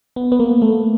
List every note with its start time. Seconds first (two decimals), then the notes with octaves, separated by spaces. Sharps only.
0.16 B3
0.32 B3
0.40 A#3
0.62 A3